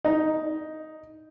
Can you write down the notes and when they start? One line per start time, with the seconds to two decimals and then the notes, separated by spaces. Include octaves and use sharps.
0.05 D#4